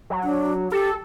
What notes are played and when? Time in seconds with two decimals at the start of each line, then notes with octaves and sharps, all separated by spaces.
0.10 F#3
0.24 D4
0.72 G4 A4